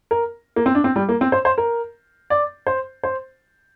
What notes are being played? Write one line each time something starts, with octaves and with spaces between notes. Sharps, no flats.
A#4
A#3
C4
D4
C4
G3
A#3
C4
C5
C5
A#4
D5
C5
C5